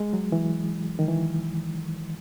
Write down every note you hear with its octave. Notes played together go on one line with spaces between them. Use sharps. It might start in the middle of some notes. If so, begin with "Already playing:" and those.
Already playing: G#3
F#3
E3
D#3
E3